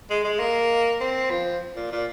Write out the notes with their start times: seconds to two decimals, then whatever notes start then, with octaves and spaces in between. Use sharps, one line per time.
0.10 G#3
0.24 G#3
0.40 A#3
1.01 C4
1.30 F3
1.76 A#2
1.92 A#2